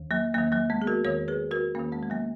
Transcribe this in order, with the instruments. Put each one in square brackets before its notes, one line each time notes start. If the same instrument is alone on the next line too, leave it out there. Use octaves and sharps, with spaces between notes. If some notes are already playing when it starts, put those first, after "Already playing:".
Already playing: [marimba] E2 D#3
F#3 A#3
E2 F#3 A#3
D#3
F#3 A#3
G#3 B3
G#4
F#4 A#4
E2 D#3 A#4 C#5
G#4 B4
F#4 A#4
E2 D#3 A#3 C#4
G#3 B3
G#3
F#3 A#3